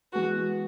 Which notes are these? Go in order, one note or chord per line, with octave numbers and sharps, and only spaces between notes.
E3 G#3 B3 F#4